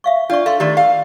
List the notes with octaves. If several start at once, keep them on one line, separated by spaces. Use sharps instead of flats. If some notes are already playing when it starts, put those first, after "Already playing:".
E5 F5 C#6
D4 F4 D5 C#6
A4 F5 C6
D#3 A3 G4 D5 C#6
F5